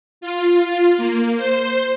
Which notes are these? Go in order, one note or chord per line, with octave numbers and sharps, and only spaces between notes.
F4
A#3
C5